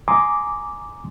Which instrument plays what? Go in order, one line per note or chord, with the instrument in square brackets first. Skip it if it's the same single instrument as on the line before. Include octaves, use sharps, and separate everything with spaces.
[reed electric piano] G#5 A#5 C6 D6 D#6